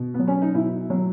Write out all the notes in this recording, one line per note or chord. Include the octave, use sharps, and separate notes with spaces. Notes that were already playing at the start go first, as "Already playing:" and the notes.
Already playing: B2
B3
F#3
C#4
D#4
B2 E4
F#3